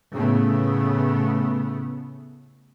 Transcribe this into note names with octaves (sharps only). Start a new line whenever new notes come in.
A2 C#3 A3 B3